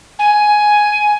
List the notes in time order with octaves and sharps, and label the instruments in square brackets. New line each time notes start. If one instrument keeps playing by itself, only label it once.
[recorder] G#5